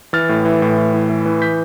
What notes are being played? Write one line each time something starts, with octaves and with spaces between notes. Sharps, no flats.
E3 F6 A6
A2
E3
A2
A2
E3
E3
E3
G6 B6